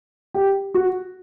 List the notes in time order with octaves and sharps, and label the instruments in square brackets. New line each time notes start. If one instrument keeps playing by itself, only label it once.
[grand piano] G4
F#4